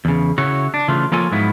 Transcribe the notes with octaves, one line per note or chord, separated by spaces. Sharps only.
E2 C#3
C#3 E4 F#4 C#5
D4
C#3 E3 A3 F4
F3 A#3 F4 A4 C#5 G#5
G#2 F3 F#3 B3 E4